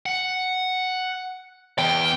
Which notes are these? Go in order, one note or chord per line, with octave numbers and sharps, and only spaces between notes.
F#5
E2 G5